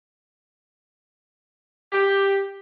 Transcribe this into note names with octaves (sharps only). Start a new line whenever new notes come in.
G4